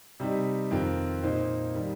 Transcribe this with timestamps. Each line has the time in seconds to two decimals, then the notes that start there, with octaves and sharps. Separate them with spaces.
0.20 C3 G3 D#4
0.71 F2 D#3 C4 F4 A#4
1.23 A#2 A#3 D#4 C5
1.75 D#3 G3